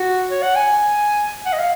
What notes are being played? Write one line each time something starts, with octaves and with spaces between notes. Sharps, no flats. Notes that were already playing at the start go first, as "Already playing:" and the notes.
Already playing: F#4
C#5
F#5
G#5
F#5
D#5
F5